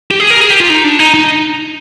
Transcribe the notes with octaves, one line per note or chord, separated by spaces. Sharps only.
G4
G#4
A#4
G#4
G4
F4
D#4
D4
D#4
D#4